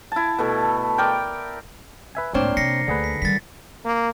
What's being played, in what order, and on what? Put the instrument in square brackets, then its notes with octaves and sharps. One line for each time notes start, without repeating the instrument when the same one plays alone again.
[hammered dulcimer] E4 A5
B2 A3 A4
A#4 D5 G5
[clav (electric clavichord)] B4 E5 G#5
[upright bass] C#2 A2 [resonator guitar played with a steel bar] A#3 D4 C5 [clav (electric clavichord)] C4 C#5
[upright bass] C3 [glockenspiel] A#6 C7 C#7
[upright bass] D2 [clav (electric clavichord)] D3 G#4 B4
[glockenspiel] B6
[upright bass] D#3 G3 [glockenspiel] A6 B6
[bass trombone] A#3